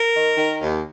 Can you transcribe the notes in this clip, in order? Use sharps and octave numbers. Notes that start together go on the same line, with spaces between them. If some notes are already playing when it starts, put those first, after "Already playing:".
Already playing: A#4
D#3
D#3
D#2